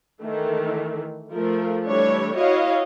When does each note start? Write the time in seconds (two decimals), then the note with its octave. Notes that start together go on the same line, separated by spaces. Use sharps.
0.23 D#3 E3 A3
1.32 F3 A3 A#4
1.87 E3 G3 A3 D4 C#5
2.36 E4 F#4 C#5 D#5 F5